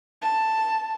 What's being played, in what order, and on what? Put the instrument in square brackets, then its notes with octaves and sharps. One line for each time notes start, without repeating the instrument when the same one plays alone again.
[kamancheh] A5